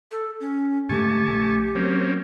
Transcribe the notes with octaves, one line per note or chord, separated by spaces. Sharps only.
A4
C#4
G#2 D3 A3 G4 G#5 A5 C#6
A#1 A3
F#3 A#3 C4 C#4